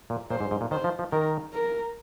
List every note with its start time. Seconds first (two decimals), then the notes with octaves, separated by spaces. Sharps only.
0.10 A#2
0.30 A#2 C5
0.40 G#2
0.51 G#2
0.61 A#2
0.71 D#3 C5
0.84 F3
0.99 F3
1.12 D#3 A#4
1.53 A#4